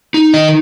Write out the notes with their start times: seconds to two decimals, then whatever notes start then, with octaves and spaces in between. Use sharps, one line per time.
0.14 D#4
0.34 D#3 D#5